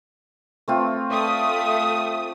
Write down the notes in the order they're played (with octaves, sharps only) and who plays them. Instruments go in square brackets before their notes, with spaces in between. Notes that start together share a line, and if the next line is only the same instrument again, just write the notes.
[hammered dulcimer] A3 C4 F4
[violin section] A3 D#6 [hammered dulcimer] D5